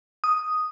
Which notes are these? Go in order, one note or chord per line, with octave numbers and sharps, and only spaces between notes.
D#6